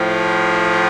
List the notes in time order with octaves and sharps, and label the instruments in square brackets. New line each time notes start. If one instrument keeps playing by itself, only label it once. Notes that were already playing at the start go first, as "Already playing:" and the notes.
Already playing: [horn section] A2 F3